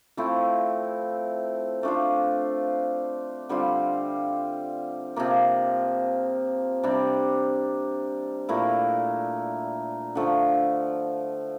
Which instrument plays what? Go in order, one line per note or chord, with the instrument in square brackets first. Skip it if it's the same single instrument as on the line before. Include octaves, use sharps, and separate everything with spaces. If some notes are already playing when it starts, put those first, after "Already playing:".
[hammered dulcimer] F3 A3 C4 E4
A3 D4 F4 C5
D3 G3 C4 F4
C3 F3 A#3
C3 G3 D4
A#2 A3 E4 A#4
D3 F3 A3